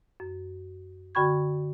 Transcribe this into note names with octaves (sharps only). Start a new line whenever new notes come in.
F#2
D3 F#4 G5 B5 C#6 G#6